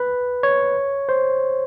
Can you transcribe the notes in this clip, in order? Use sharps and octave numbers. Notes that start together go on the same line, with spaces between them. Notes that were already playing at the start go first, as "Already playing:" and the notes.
Already playing: B4
C#5
C5